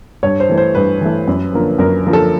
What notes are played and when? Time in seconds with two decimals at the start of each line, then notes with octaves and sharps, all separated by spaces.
0.23 G2 C#5
0.40 C5
0.49 E3 A3
0.58 C5
0.75 G2 B4
1.01 E3 A3
1.28 F#2
1.53 D3 F3 A#3
1.79 F#2 A#4
2.06 D3 F3 A#3
2.13 A4